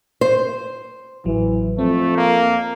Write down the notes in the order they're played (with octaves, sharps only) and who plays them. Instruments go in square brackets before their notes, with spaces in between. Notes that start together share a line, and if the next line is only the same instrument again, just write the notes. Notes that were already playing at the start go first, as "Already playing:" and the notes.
[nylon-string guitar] C5
[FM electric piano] A1 F#3 [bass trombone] E3
[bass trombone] F2 [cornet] A3 [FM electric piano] C4
[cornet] A#3